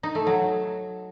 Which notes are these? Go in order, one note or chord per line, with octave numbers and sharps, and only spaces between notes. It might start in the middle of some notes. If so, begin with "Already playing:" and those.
D#4
A3
F#3